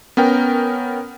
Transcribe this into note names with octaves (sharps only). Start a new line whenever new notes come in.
B3 C#4 A#4 G5